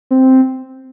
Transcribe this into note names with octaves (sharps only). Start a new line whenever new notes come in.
C4